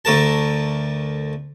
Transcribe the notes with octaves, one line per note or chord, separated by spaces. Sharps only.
D2 A3 A#4 A5